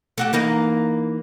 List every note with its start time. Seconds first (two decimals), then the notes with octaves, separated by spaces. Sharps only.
0.18 A3 F#4 G4
0.33 E3 A#3 D#4